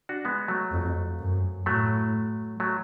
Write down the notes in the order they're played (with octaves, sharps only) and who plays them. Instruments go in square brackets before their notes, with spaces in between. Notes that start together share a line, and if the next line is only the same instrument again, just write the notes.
[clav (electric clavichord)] D4 F#4
G#3 B3
F#3 A3
[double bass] F2
F#2
[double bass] A2 [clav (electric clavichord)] F#3 A3
[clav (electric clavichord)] F#3 A3